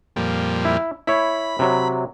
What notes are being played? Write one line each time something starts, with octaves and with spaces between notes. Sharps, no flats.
F2 A#2 G3
E4
E4 C#5 B5
C3 F#3